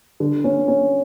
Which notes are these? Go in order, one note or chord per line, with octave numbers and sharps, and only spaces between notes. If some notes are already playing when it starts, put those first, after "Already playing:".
D3
C#4
C#4